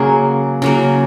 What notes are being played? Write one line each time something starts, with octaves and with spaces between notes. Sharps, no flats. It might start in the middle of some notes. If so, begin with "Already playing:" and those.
Already playing: C#3 F#3 A#3 G#4
C#3 F#3 A#3